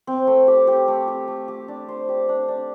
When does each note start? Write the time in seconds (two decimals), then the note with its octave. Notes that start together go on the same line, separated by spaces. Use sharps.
0.07 C4
0.27 A3
0.48 G4
0.67 G4
0.88 A3
1.08 G4
1.28 A3
1.48 G4
1.68 D4
1.88 C5
2.08 G4
2.29 D4
2.48 D4